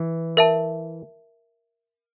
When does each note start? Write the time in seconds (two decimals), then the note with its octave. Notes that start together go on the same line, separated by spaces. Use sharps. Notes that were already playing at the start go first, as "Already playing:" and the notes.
Already playing: E3
0.37 A#4 E5 A5